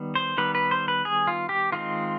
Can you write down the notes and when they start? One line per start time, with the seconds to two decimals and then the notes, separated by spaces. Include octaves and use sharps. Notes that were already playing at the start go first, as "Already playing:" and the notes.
Already playing: D#3 G3 B3
0.15 C5
0.37 D#3 G3 B3 B4
0.55 B4
0.71 C5
0.88 B4
1.05 G#4
1.27 F4
1.49 G4
1.72 D#3 G#3 C4 F4